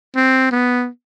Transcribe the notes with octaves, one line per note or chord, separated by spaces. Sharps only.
C4
B3